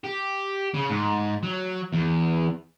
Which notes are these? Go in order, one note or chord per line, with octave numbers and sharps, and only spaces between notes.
G4
C#3
G#2
F#3
E2